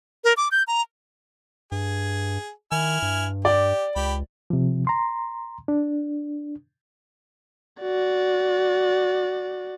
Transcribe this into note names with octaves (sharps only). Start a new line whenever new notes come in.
A#4
D6
G6
A#5
G2 G#4
D#3 E4 G#5 F6
G2
G4 D5
C#2 G4 B5
C3 F3
A#5 C6
D4
F#4 D5